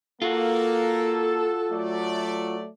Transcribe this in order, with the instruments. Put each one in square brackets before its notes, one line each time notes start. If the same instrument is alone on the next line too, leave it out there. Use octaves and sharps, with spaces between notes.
[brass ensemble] A#3 [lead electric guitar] F4 F#4 [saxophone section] A4
[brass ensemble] F#3 A3 D5